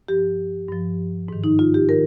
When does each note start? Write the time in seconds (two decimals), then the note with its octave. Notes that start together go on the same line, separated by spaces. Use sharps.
0.08 G2 F3 G4
0.68 G2 F3
1.28 G#2 D#3
1.44 D#4
1.59 F4
1.74 G4
1.89 D#3 A#4